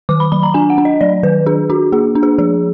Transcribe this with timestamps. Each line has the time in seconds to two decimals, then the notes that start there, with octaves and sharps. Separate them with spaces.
0.09 D#3 D6
0.20 B5
0.32 F#3 B5
0.43 A#5
0.54 D4 G#5
0.70 F#5
0.78 D4
0.85 D#5
1.01 F#3 D5
1.23 D#3 B4
1.46 D4 G#4
1.70 D4 F#4
1.92 A#3 G#4
2.15 D4
2.23 G#4
2.38 F3 G#4